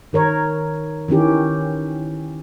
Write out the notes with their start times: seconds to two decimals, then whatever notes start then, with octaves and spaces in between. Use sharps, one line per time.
0.13 D#3 A#4 C#5
1.08 D#3 E3 C#4 G4